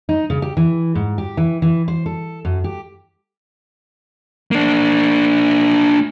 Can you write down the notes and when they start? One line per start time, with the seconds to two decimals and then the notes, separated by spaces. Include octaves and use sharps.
0.09 D#4
0.30 C#3
0.42 G4
0.57 E3
0.95 G#2
1.18 G4
1.37 E3
1.62 E3
1.88 C5
2.06 A4
2.45 F#2
2.64 G4
4.51 A#3 D4